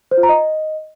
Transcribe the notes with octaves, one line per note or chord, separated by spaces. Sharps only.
C5
F4
A#5
D#5